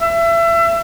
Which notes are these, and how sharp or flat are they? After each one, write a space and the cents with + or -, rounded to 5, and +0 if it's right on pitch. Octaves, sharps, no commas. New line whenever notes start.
E5 +30